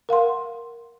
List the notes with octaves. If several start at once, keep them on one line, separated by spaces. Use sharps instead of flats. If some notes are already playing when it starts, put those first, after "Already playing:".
A#4 F5 F#5 C6